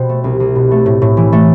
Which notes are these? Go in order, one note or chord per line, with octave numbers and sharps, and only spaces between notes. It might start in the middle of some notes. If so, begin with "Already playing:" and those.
Already playing: B2 C5 G5
A3
C2
C2
B2
A3
A2
A2
E3
A3